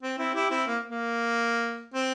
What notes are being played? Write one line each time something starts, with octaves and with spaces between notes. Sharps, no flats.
C4
C4 E4
E4 G4
C4 E4
A#3
A#3
C4